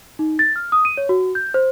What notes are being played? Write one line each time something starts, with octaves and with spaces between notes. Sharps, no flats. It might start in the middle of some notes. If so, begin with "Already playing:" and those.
D#4
A6
F6
D#6
D#7
C#5
F#4
G6
C5